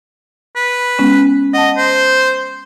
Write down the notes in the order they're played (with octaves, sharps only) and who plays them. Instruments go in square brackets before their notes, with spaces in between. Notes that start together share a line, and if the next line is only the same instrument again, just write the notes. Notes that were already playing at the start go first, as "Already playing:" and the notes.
[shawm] B4
[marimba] G#3 B3 C#4
[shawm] D#5 [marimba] F#5 A5
[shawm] C5